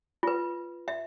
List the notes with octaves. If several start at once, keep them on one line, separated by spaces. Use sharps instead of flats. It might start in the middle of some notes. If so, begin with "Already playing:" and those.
F4 B4
E5